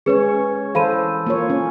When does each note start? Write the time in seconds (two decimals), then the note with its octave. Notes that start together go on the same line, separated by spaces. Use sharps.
0.06 G#3 C#4 G#4 B4 C#5
0.75 E3 A4 C5 F5 B5 D#7
1.26 A#3 F4 C#5
1.50 C#4